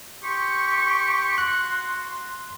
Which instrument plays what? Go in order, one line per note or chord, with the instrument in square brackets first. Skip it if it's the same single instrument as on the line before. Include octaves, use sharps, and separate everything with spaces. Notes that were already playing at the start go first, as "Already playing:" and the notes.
[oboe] G4 [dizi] C6 [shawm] C#6
[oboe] F#4 [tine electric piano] F#6